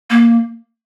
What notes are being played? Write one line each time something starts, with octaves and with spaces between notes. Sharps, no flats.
A#3